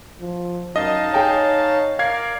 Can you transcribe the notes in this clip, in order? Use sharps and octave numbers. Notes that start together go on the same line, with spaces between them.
F3
F#2 D#4 D#5 F5 A5
G#4 C#5 G5 G#5
A#4 D5 F5 G#6 C7